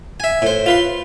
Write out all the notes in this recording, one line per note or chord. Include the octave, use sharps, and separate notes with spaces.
E5 G#5
A2 C5
F4 B4 C6